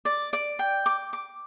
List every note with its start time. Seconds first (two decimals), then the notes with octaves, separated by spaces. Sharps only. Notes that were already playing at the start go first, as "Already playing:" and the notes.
0.05 D5
0.33 D5
0.59 G5
0.86 D6
1.13 D6